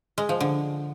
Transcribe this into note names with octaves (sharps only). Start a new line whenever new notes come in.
G#3
F3
D3